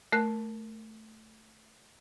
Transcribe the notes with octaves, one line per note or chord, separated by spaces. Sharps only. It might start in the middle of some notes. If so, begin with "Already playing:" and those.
A3 A#4 F#6